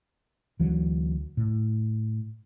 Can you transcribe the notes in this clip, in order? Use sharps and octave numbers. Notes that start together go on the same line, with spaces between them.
D2 E3 F#3
A2